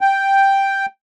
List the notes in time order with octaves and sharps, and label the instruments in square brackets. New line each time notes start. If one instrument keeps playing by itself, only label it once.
[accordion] G5